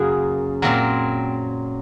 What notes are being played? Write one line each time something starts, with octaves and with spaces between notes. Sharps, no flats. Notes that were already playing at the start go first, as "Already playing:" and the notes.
Already playing: F#2 C#3 A#3 F#4 G#4
A#2 F#3 A#3 C4